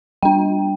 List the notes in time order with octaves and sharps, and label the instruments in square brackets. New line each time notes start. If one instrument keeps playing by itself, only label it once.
[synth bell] G3 D4 G5